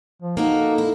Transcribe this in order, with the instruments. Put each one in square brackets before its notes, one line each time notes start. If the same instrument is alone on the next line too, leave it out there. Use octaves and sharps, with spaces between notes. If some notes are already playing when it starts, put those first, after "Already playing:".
[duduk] F3
[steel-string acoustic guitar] A#3 F#4 A4 [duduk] D#4
[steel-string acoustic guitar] E4